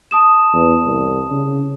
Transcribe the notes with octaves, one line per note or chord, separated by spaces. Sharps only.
A5 D#6 E7
E2
C2
C#3